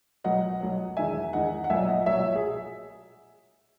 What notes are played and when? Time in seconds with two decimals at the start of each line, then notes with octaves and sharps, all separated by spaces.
0.24 B1 B2 F#3 D#5 F#5
0.61 B1 B2 F#3
0.97 E2 D#3 G#3 E5 G#5
1.33 E2 D#3 G#3 D#5 F#5
1.64 F#5
1.70 B1 A#2 F#3 E5 G#5
1.88 D#5 F#5
2.06 B1 A#2 F#3 C#5 E5
2.36 G#4